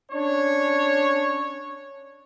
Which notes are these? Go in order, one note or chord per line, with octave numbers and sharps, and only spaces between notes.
C#4 D4 C#5